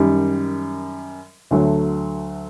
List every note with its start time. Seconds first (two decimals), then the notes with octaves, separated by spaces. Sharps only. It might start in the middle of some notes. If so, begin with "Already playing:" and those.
Already playing: F#2 D#3 G3
1.51 D2 D3 F#3 A3